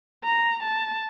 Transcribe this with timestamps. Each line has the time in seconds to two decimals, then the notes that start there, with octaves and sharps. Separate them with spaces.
0.24 A#5
0.63 A5